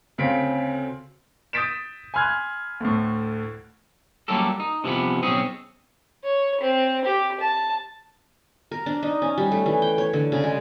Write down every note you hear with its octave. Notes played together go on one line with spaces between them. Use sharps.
D2 C#3 C4 F5 B6 D7
D#6 G6 A6 B6 D7 E7
G#5 B5 C6 F6 F#6 G#6
D2 A2
F#3 G3 A#3 C#4 G4 A4
D#4
C3 E3 F3 B3
B1 C4 C#4 G#4
C#5
C4
G4
A5
A#4
D4
D#4
C#4
G3
A3
E3
G5
C#5
D3
C#3
G#3